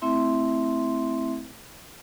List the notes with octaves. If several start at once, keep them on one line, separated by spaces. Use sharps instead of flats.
A3 C4 E4 E5 C6